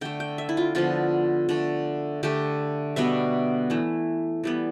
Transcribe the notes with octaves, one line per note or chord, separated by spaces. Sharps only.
D3 A3 G5
G5
E5
E4
F4
D3 F3 B3 F4
D3 A3
D3 A3 G4
B2 G3 B3 E5
E3 A3
E3 G3 B3